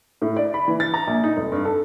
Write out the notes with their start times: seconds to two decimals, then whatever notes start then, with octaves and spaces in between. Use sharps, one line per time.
0.22 A2
0.37 D5
0.54 B5
0.68 E3
0.80 A6
0.94 A#5
1.07 A#1
1.24 D#4
1.37 F1
1.52 G2
1.65 A4